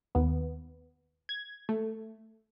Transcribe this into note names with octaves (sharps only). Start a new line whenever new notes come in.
D#2 B3
G#6
A3